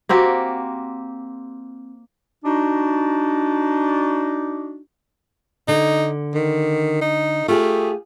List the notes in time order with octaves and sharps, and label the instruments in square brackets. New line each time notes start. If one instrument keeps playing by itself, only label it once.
[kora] A#3 C4 F#4 G4
[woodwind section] D4 D#4 F#4
[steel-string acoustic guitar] D3 [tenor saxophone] D#4
[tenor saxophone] D#3
D#4
[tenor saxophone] A3 [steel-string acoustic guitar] F4 G4 G#4